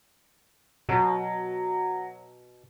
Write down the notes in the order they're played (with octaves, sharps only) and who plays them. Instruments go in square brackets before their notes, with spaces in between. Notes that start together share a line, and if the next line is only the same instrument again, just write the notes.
[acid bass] B2 [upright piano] F#3